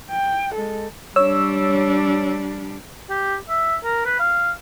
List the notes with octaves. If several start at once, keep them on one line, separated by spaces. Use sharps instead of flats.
G5
G#3 A4
G3 D4 C#5 E6
G4
E5
A#4
B4
F5